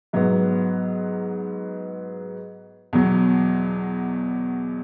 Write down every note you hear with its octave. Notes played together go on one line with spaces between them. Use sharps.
G#2 F#3 B3
E2 B2 F#3